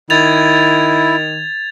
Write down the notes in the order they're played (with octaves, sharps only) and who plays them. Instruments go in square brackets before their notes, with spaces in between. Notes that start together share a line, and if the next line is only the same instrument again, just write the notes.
[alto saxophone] D#3 [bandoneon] E4 [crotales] G#6 A6 F7